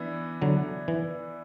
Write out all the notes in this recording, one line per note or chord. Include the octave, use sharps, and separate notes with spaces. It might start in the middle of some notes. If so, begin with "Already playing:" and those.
Already playing: E3 B3 D4
D3 F#3
E3